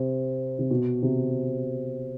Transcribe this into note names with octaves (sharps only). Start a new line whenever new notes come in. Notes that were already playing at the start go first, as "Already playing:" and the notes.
Already playing: C3
C3
B2
C3